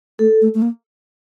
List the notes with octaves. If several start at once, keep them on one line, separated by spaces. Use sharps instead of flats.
A3 A4
A3
A3
A#3